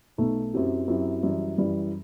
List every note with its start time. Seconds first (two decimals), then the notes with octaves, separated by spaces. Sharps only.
0.18 B1 B2 A3 D#4
0.54 F#2 F#3 C4 E4 G4
0.88 F#2 F#3 C4 E4 G4
1.23 F#2 E3 G3
1.58 F#2 E3 G3